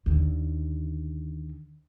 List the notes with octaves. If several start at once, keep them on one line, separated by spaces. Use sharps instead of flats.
D#2 D3